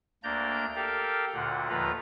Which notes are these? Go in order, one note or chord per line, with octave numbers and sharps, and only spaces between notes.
D2 A#3 D4 D5 A#5 G6
G4 A4 A#4 F5 G5
D2 A#2 D3 F#5
D#2 D3 F3 F4 B4 A#5